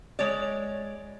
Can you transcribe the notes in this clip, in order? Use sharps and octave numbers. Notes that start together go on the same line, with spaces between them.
G#3 C#5 D5